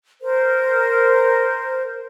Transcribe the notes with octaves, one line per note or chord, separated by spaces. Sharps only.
A#4 C5